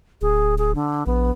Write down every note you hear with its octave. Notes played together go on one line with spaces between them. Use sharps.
D1 G#4
G#4
D3
A#1 B3